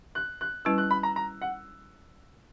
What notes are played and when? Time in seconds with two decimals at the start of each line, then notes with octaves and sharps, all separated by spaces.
0.15 F#6
0.41 F#6
0.65 G3 C#4 E4 B4 E6
0.78 F#6
0.91 B5
1.03 A#5
1.16 A#5
1.42 F#5